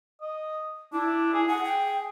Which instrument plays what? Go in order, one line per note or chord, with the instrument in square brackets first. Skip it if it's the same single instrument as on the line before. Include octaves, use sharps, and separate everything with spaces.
[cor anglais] D#5
[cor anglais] D4 [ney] E4
[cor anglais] G#4
[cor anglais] G#4 [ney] F#5
[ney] G5